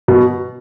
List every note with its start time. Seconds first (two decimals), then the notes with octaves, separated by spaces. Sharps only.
0.08 B2